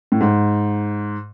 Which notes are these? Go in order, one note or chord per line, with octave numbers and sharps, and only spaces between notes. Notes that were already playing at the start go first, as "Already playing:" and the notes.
A2
G#2